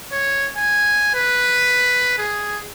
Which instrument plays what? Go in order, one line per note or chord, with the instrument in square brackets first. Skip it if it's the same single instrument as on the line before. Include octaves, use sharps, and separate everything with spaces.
[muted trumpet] C#5
G#5
B4
G#4